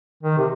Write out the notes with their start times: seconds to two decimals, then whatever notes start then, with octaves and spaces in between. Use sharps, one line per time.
0.23 D#3
0.38 C3